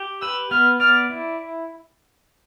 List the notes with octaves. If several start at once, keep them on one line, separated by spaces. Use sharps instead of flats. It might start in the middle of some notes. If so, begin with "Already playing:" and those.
Already playing: G4
B4 E6
B3 F6
D5 F6
E4